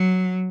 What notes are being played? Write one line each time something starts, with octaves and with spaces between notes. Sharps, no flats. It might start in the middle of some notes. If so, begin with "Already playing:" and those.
Already playing: F#3